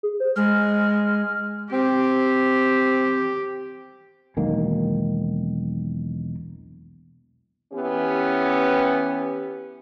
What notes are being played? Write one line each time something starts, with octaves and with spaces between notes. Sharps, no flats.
G#4
C5
G#3 F6
C4 G4
E1 B1 D#3 A#3
E3 B3 C#4 G4